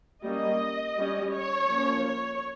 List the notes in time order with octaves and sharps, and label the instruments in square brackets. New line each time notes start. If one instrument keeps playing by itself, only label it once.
[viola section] G3 A#3 C#4 D#5
G3 C#4
C#5
F3 A#3 C#4
C#5